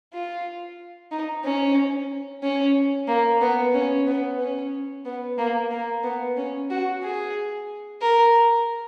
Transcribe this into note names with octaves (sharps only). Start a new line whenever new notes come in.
F4
D#4
C#4
C#4
A#3
B3
C#4
B3
C#4
B3
A#3
A#3
B3
C#4
F#4
G#4
A#4